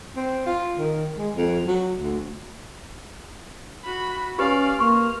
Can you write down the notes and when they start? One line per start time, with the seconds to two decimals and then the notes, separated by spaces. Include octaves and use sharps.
0.16 C4
0.46 F4
0.78 D#3
1.17 G#3
1.36 F2
1.67 F#3
2.00 D2
3.84 F#4 B5
4.39 C#4 G4 B4 D5 F5
4.79 A#3 C6 C#6 F6